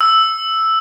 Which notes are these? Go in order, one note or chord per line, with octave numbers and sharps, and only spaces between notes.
E6